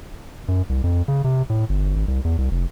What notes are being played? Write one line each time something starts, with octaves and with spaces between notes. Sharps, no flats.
F#2
C2
F2
C#3
C3
A2
G1
G#1
C2
E2
C2
F1